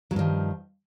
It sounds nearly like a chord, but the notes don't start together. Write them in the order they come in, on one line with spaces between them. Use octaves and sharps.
F#3 G2 F3 D#3